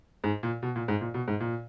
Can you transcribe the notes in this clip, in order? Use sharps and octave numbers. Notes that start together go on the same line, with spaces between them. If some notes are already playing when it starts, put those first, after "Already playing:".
G#2
A#2
B2
A#2
G#2
A#2
B2
G#2
A#2